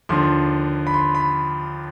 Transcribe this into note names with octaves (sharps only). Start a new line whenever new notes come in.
D#2 D3 F3 C6
B5
C6
B5